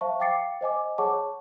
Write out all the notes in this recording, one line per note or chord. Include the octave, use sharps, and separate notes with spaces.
C5 E5 F5 A5 C#6
F5 G5 D6 A6 C7 C#7
C5 D#5 G#5 D6
G#4 C#5 F#5 A5 C#6 D6